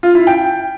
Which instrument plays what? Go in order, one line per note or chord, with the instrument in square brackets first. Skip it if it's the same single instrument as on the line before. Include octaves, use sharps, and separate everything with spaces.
[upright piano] F4
E4
G5